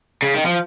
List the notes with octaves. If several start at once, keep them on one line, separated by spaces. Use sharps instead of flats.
C#3
D#3
F3